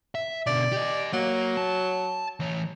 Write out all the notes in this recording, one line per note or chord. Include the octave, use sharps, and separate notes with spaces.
E5
B2 D3 D5
G4 D#5
F#3 A#3
A5
E3 C#5